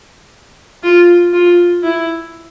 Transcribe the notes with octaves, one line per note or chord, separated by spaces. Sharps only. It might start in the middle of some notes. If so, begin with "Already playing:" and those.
F4
F4
E4